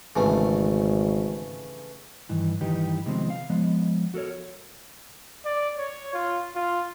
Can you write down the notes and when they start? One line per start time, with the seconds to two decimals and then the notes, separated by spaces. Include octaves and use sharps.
0.16 G#1 C#3 E3 A3
2.29 G2 D#3 E3
2.61 G2 D#3 E3 D#4 G4 B4
3.06 C3 D#3 F3 G#3 B3 C4
3.30 F5
3.50 F3 G#3 B3
4.14 F#4 A4 A#4 C#5
5.46 D5
5.78 C#5
6.14 F4
6.55 F4